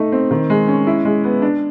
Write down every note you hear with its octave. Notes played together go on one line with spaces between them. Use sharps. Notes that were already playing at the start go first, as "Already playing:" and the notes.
Already playing: A3 D#4
C4
D#3
G#3
C#4
E4
G#3
B3
D4